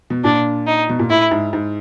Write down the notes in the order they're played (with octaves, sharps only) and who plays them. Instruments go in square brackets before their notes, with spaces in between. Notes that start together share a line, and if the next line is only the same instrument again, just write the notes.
[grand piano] B2
[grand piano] A#2 [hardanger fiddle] D4
[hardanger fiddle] D#4
[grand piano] B2
A#2
[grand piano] A2 [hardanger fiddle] E4
[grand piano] G#2
G#2